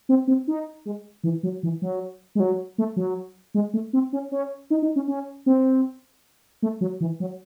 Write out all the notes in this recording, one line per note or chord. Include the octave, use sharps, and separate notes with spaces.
C4
C4
D#4
G#3
E3
F#3
E3
F#3
G#3
F#3
A3
F#3
G#3
A3
C4
C#4
C#4
D#4
D#4
C#4
C#4
C4
A3
F#3
E3
F#3